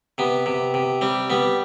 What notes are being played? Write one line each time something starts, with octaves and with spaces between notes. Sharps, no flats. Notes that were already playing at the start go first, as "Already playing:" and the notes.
C3 B3
C3
C3
G3 C4
G3 B3